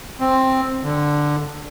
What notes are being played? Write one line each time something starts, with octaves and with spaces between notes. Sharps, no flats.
C4
D3